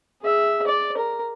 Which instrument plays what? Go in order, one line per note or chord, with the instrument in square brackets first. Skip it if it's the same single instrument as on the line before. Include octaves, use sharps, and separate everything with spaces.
[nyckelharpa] G#4 E5
D5
A#4